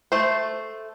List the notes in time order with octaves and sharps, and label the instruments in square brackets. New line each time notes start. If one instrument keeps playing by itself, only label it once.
[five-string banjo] A3 C5